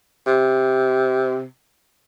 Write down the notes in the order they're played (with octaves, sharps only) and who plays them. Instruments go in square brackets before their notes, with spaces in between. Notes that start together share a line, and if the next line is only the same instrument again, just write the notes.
[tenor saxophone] C3